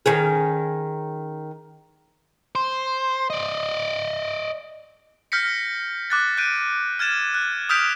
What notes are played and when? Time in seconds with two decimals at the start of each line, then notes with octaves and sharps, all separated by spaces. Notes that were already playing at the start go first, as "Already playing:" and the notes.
0.06 D#3 C#4 G#4
2.55 C5
3.30 D5 D#5
5.32 F6 G6 A#6 B6 C#7
6.10 D6 F#6 A6
6.38 F#6 G6 D7 D#7
6.99 F6 G#6 A6 E7
7.34 F#6
7.69 D#6 F6 G6 B6 D7 F7